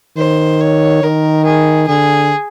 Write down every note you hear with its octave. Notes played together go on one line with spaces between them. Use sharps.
D#3 C5
C#5
D#3 A#4
G#4
D3 G#4